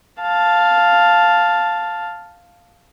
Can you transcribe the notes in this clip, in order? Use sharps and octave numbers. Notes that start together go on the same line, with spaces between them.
F5 A5